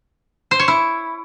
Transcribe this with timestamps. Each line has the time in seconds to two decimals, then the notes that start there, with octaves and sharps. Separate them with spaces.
0.51 C5
0.59 C#5
0.68 E4